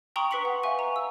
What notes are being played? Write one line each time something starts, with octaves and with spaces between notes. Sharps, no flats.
G5 A#5 C6 C#6 D#6 F#7
B4 C#6 B6 C#7 F#7
F#5
E5 F5 G#5 C#6
A#5
E6